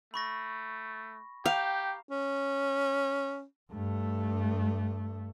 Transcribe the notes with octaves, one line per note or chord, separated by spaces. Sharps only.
A3 B5 C#6 A#6
G4 F5 G5 A#5
C#4
G2 A3